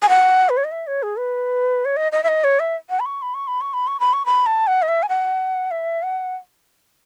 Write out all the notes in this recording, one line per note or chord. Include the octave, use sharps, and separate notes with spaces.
G#5
F#5
B4
C#5
D#5
E5
C#5
G#4
B4
C#5
D#5
D#5
E5
D#5
C#5
E5
F#5
B5
C#6
B5
C#6
B5
C#6
B5
C#6
B5
C#6
B5
A5
F#5
D#5
E5
G#5
F#5
E5
F#5